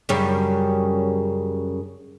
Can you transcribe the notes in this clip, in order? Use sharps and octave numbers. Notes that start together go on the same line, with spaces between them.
F#2 C#3 G3